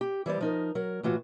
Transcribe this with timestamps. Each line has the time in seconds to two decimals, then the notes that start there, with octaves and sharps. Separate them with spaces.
0.01 G4
0.26 E3 G3 C5 D5
0.41 F3 D#4 A#4
0.75 F#3 A#4
1.03 A2 E3 F4 F#4